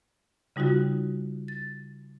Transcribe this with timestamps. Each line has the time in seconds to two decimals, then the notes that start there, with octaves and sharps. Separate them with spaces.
0.56 C#3 G3 D#4 F4 F#4
1.48 A6